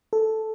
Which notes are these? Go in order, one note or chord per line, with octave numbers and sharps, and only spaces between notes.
A4